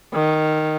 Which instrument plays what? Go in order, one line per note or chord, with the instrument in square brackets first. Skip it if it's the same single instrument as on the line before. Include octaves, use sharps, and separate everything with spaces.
[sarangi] D#3